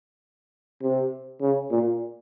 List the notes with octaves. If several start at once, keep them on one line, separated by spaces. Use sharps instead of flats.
C3
C#3
A#2